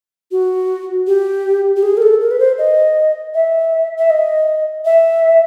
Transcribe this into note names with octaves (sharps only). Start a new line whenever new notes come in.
F#4
G4
G4
G#4
A#4
A4
A#4
B4
C5
D#5
E5
E5
D#5
E5